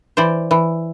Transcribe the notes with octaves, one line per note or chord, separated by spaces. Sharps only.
E3 C5 D5
E3